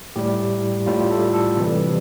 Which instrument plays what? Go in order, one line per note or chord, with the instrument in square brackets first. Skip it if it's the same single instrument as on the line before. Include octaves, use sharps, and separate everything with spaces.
[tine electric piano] A2 G3 G4
A2 G3 F4
A4
A4
C3 E3 G3